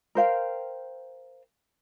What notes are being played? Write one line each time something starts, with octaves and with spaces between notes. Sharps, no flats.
A#4 C5 F5 G5